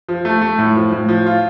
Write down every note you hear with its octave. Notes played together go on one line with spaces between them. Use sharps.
F3
A3
A3
A2
F3
A2
F3
F4